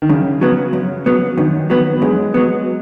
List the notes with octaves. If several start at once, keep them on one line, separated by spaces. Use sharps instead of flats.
D#3
F#2 C#3
F#3 B3
F#2
F#3 B3
F#2 D#3
F#3 B3
B3
F#2 G#3
F#3 B3